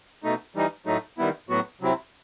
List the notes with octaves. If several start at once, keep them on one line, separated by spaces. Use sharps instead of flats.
B2 A3 D#4
E3 G3 D#4
A2 F#3 A3 D#4
D#3 G3 B3 E4
A2 F#3 B3 F#4
C3 F#3 C4 E4